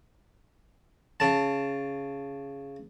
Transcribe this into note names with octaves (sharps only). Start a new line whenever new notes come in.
C#3 A5